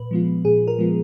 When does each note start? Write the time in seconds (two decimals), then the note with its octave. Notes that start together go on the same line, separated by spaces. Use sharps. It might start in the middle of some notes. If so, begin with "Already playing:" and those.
Already playing: A#2 B4
0.11 F3 G#3 B3 F4
0.45 A#2 G#4
0.68 A#4
0.79 F3 G#3 B3 F4